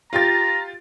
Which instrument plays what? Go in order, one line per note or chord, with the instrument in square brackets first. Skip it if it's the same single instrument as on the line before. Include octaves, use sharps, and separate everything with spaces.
[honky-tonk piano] F4 G4 A6 [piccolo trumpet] A#5